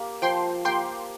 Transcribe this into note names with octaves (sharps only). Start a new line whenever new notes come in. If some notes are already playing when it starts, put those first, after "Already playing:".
Already playing: A#3 G4
F3 G5 C6
A#3 G4 G5 C6